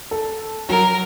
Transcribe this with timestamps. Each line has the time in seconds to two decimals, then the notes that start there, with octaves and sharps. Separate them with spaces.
0.11 A4
0.69 F#3 A#4 A#5